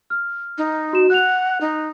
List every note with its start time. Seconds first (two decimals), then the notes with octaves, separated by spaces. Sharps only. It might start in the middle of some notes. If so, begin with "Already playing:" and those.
0.10 F6
0.58 D#4
0.93 F#4 E7
1.10 F#5 F#6 F7
1.61 D#4